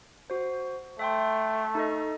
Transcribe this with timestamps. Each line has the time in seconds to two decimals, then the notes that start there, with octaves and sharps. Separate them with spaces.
0.30 F#4 C5
0.99 A3 E5 G5 C6
1.75 D#4 A4 D#5